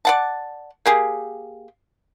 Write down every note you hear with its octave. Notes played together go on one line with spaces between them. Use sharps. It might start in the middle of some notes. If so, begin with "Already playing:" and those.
D5 F#5 A5
A#3 G4 G#4